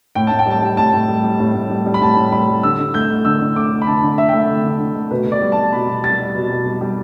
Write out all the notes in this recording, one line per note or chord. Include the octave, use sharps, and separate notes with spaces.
A2 G5
A2 A5
G5
G3 A5
G3 G5
A2 A5
A2
G3
G3
A2
A2
G3
G3
B5
A2 A5
A2
G3 B5
G3
D3 E6
D3
A3 G6
A3
D3 E6
D3
A3 D6
A3
B5
D3 A5
D3
A3 E5
A3 G5
E5
D3
D3
A3
A3
B2 B4
B2
D5
G3
A5
G3
B2 B5
B2
G3 A6
G3
B2
B2
G3
G3